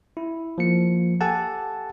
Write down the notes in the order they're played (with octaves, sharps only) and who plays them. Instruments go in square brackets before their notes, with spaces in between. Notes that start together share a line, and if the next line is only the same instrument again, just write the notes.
[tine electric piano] E4
F3 A#3 C#7
G4 A4 F#5 G#5 A5